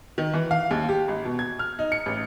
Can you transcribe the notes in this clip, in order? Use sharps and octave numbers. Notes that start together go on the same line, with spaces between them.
D#3
E3
F5
D#2
G4
G#1
B2
G#6
F6
D#4
C#7
A1